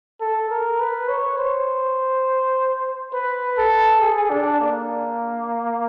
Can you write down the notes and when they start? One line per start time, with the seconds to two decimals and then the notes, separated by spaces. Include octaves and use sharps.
0.21 A4
0.50 A#4
0.80 B4
1.09 C#5
1.38 C5
3.13 B4
3.58 A4
4.01 G#4
4.30 D4
4.60 A#3